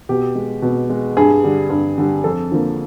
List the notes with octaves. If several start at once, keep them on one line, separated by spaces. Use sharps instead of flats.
B2 G4
G#3
B2
G#3
G2 G#4
D3 G3
G2
D3 G3
F2 A4
D3 F3 A#3